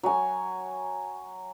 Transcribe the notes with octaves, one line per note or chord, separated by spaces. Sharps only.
F#3 G#5